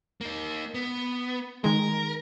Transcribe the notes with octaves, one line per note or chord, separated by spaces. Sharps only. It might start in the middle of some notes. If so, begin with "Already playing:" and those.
A#3 D#4
B3
D#3 G#3 A#4